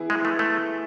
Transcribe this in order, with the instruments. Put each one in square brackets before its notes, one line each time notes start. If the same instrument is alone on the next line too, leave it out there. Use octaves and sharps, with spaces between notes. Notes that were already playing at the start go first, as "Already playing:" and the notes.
Already playing: [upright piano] E3 B3 E4 G#4
[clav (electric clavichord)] G#3
A3
A3